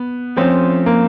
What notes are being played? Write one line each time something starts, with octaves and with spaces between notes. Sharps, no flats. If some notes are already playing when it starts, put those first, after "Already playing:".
Already playing: B3
F3 A3 C4 C#4 F4
A#3